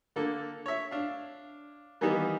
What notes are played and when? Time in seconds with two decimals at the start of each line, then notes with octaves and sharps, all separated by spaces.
0.16 D3 A#3 A4
0.66 C#5 E5
0.91 D4 F5
2.01 D#3 E3 G3 A#3 B3 D#4